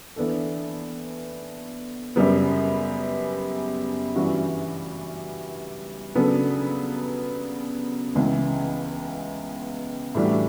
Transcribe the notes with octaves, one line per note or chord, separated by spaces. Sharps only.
E3 B3 D4 A4
F#2 C#3 G3 B3
G2 E3 G3 C#4 F#4
C#3 F#3 B3 D4 A4
C#2 C#3 E3 B3
A2 E3 G3 D4 F#4